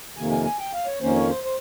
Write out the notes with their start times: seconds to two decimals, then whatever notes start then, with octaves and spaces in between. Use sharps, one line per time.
0.16 F2 C3 D#3 A#3 G#5
0.31 G#5
0.45 G#5
0.59 G5
0.73 F5
0.86 C#5
1.01 F2 D#3 A#3 C#4 C5
1.15 C#5
1.29 C5
1.44 C5